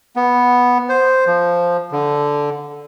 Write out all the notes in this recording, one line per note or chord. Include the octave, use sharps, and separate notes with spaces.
B3
C5
F3
D3